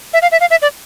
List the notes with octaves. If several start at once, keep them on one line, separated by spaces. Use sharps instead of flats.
E5
F5
E5
F5
E5
D5